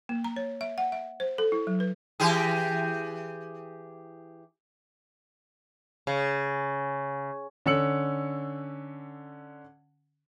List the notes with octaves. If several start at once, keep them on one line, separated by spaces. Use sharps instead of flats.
A#3
A#5
C#5
E5
F#5
E5
C5
A4
E4
F#3
B4
E3 G4 G#4
C#3
D3 C#4 E6 C#7 F#7